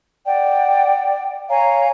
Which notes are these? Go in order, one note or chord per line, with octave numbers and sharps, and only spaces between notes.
D5 F#5 G5
C#5 F5 G#5 A#5